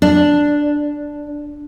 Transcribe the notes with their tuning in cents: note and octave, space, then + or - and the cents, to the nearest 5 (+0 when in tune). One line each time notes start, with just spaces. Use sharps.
D4 +0